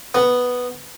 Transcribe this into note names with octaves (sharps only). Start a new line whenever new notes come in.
B3